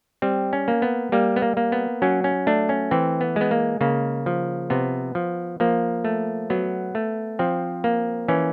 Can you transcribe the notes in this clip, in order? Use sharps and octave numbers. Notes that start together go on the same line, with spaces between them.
G3 C4
C#4
A#3
B3
G3 A#3
B3
A#3
A#3
B3
F#3 C#4
C#4
A3 D4
C#4
E3 C4
B3
G#3 B3
A#3
C#3 A#3
F3
C3 B3
F3
F3 A#3
A3
F#3 B3
A3
F3 C4
A#3
E3 C#4